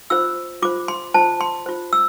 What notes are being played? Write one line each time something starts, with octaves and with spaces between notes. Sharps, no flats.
F4 C5 E6
F4 C5 D6
C6
F4 C5 A5
C6
F4 C5
E6